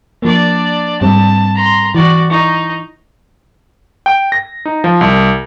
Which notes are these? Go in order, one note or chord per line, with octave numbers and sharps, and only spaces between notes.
F3 A#3 D4 D5
G#2 G3 C4 A5
A#5 C6
E3 F#4 D5
D#4 E4 C#6
G5
A#6
D#4
F3
C2